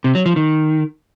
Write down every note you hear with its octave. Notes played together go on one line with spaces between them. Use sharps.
C3
F#3
F3
D#3